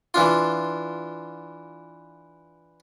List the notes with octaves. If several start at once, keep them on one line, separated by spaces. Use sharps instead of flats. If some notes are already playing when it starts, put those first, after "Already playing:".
E3 D4 F4